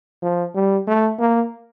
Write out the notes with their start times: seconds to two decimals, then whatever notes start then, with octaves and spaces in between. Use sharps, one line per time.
0.22 F3
0.55 G3
0.87 A3
1.19 A#3